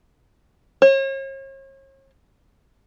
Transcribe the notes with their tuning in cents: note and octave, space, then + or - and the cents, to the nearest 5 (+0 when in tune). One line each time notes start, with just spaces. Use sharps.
C#5 -40